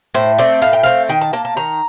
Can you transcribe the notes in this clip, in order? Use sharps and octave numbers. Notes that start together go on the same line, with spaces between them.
A2 C5
A3 C4 D5
A2 F5
G5
A3 C4 F5
D#3 G5
A5
A#3 A5
A5
D#3 A#5